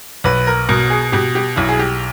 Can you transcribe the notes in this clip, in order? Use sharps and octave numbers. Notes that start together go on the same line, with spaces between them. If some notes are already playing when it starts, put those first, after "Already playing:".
B1 B4
A#4
B2 A#4
G#4
B2 G4
G4
B1 E4
G#4
G4